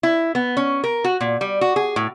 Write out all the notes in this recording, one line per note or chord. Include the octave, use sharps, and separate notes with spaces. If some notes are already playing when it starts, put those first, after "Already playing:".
E4
B3
C#4
A#4
F#4
A#2
G3
F#4
G#4
A2